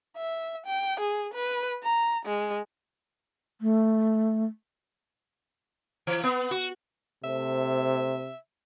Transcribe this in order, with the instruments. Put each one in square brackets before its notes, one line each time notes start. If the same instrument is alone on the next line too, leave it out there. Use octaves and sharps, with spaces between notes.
[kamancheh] E5
G5
G#4
B4
A#5
G#3
[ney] A3
[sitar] E3
B3
F#4
[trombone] C3 [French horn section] A3 C5 [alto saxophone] E5